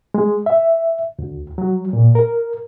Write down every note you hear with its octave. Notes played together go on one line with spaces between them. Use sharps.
G#3
E5
D2
F#3
A#2
A#4